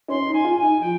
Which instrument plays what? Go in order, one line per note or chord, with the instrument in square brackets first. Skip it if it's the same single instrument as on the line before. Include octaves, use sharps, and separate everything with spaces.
[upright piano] C#4 [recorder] C6
[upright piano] D#4
[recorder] G#5
[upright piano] F4
[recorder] G#5
[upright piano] D#4
[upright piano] F3 [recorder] G5